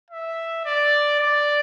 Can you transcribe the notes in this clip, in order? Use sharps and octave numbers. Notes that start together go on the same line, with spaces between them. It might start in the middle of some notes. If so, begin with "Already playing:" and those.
E5
D5
D5